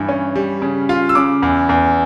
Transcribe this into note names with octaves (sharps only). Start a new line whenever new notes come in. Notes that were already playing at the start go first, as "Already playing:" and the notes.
Already playing: G2 E3
C#4
G3
C#3
F4
E6
C#3 D6
E2
E2